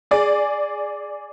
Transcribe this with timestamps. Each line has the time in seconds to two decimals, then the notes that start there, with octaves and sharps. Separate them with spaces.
0.11 G#4 D5